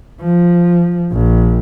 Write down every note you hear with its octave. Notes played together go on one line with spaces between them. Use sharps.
F3
A#1